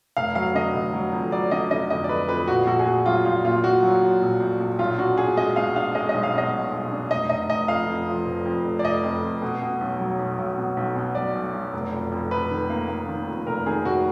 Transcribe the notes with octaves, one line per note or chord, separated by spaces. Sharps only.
F1 F5
F#3 F5
D3 D#5
F1
F#3
F2
F#3 D5
D3 D#5
D3 D#5
F2 D#5
D5
F2 B4
F2 B4
A#1 F#4
A#1 F#4
G#4
A#1 F#4
F#3 F4
A#1 F4
A#2 F4
A#2 F#4
F#3
F#3
A#1
A#1
A#1
B1 F4
D4 F#4
D4 G#4
G#3 D#5
B2 F5
D4 F5
G#3 D#5
D#5
B1
F5
B2 D#5
B1
B1
D4
F1 D#5
F1 D#5
F1 D#5
F2 F5
F2
F3
F1
F2
F1
D5
F1 D#5
F2
F2
B2
B2
B1
F#3
B1
B1
B2
B1
B2
F#3 D5
B1
B1
F1
F2
F2
F2 B4
D#3
A#3
A#3
D#3
F2
F1 A#4
D#3 G#4
F1 F#4